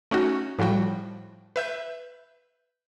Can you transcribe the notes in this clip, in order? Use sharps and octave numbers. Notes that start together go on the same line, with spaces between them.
A3 C#4 D#4 F#4
A2 F3 G3 F#4 G5
B4 E5 G6